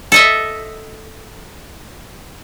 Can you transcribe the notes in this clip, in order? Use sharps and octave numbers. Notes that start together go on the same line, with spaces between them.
A4 D#5 E5